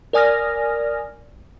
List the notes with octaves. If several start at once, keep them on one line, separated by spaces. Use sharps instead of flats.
A#4 D5 G#5 D#6 F6 A#6